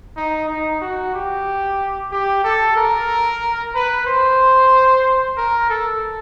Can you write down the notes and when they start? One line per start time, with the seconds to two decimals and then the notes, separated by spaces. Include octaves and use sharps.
0.16 D#4
0.49 D#4
0.81 F#4
1.15 G4
2.12 G4
2.44 A4
2.76 A#4
3.75 B4
4.07 C5
5.37 A#4
5.70 A4